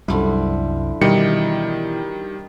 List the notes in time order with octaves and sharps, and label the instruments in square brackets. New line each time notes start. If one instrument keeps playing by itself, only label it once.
[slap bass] C2 F#2 G3 [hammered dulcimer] D3 F3 E4
[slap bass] B2 E3 [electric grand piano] D#3 G3 C#7 [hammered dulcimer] D#5 F5 G5